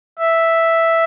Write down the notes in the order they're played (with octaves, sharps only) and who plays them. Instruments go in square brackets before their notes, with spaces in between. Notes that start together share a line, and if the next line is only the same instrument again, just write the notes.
[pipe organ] E5